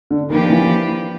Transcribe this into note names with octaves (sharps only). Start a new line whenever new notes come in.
D3
D#3 F3 A#3 D4 G4 B4
E3